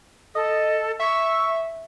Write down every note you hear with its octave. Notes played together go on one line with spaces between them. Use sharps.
A4 D#5
E5 C#6